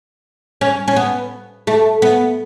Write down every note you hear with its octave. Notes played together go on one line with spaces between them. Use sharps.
C#4
C#4
B3
A3
B3